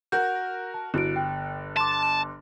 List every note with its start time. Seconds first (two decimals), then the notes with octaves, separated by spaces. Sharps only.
0.12 F#4 A#4 F#5 G6
0.74 A5
0.94 G1 E4 F#4 D7
1.16 G5
1.77 A5 C6 D6